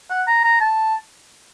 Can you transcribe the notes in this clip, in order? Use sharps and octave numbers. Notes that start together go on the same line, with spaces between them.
F#5
A#5
A#5
A5